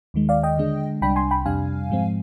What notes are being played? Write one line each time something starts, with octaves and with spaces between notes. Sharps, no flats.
D#2 D#3 G#3
D5 F5
D#5 G5
D3 G#3 D4
C2 C3 G3 D4 G5 B5
G#5 C6
G5 B5
F2 C3 G3 D4 F5 G#5
G#2 F3 G#3 C4